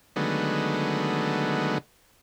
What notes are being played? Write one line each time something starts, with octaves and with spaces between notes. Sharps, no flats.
D3 D#3 F#3 G#3 A3 B3